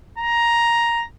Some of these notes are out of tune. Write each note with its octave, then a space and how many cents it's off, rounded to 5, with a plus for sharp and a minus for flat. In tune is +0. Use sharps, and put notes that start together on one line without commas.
A#5 +10